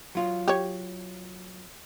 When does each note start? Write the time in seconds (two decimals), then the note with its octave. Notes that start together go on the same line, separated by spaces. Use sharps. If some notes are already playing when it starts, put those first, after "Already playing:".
0.15 F#3 F4
0.48 G4 C#5